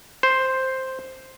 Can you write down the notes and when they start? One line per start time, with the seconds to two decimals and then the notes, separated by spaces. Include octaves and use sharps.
0.23 C5